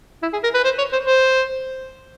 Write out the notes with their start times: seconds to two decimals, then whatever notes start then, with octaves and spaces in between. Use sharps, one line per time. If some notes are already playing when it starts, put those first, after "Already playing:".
0.22 E4
0.33 G#4
0.44 A#4
0.54 B4
0.64 C5
0.78 C#5
0.92 C5
1.06 C5